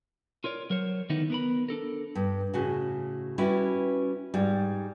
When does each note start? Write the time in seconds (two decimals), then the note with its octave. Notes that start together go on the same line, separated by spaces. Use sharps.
0.44 F4 A#4 C#5 D5
0.70 F#3 A#4 C5 C#5
1.10 D3 D#3 B3 D#4 E4
1.30 B3 A#4 B5
1.69 D4 A4 A#4
2.15 G2
2.54 A2 C#3 F#4
3.38 G3 C#4 E4 F#4 B4
4.34 G#2 G3